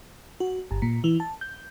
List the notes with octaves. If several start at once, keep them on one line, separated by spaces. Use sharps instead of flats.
F#4
G1
A#2
E3
A5
G6